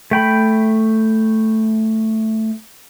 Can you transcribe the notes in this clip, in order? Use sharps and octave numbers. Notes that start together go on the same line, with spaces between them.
A3 G5 B5